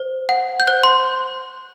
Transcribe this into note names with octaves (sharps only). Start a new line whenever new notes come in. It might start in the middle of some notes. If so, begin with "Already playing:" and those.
Already playing: C5
F#5
G6
C5 F#6
C6